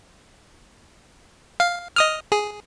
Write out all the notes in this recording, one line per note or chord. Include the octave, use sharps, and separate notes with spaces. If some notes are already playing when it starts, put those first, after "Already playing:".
F5
D#5 D#6 F6
G#4